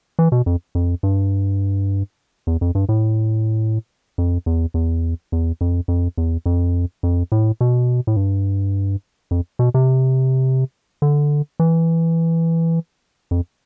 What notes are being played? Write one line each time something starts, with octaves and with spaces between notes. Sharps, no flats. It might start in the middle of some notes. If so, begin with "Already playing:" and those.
E3
B2
F2
F2
G2
E2
F2
G2
A2
F2
E2
E2
E2
F2
F2
E2
F2
F2
A2
B2
A2
G2
F2
B2
C3
D3
E3
F2